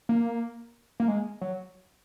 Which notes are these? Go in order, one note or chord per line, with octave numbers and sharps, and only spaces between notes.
A#3
A#3
G#3
F#3